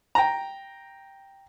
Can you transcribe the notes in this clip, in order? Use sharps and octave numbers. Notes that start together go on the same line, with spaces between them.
G5 A#5